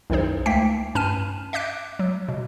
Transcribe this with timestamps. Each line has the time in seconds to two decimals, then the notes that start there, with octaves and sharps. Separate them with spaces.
0.10 B1 F#2 D#3 D#4 G#4 C5
0.46 C#2 A3 A#3 G5 B6 C7
0.95 G2 C#4 A5 F6 D#7 E7
1.53 D#5 E5 D6 F#6 B6 D7
1.99 F#3
2.29 B2